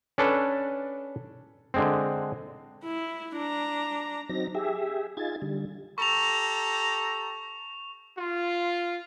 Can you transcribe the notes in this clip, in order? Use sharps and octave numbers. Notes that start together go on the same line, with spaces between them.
C#4 D4 A4 B4
D3 G#3 C4
E4
D4 A#5
F#3 C4 D#4 A#6
G4 G#4 E5
D#4 F4 G#4 G#6 A6
D3 G3
G4 A4 A#5 C#6 F7
F4